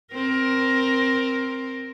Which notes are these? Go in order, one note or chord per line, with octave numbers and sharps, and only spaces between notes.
C4 A#4